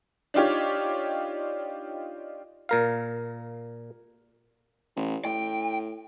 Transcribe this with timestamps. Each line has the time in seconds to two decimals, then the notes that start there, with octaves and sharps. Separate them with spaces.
0.34 D4 D#4 F4 G4 C#5
2.69 A#2 A#4 F5
4.96 A1
5.25 A2 G5